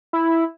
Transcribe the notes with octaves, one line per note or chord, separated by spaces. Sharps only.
E4